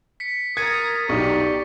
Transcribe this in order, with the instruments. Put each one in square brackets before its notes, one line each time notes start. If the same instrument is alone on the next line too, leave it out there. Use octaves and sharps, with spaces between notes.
[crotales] B6 C#7
[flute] A#4 [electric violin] A#5 D#6 [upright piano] G#6 [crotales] A6 C#7 D#7
[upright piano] B1 D#4 [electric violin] G4 [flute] D5 [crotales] C#6